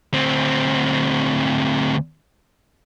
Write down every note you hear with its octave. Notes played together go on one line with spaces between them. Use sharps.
D2 C4